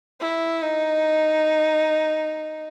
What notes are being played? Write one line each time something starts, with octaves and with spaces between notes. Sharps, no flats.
E4
D#4